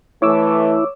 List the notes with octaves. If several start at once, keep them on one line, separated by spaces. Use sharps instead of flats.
E3 A3 E4 C#5 D6 E6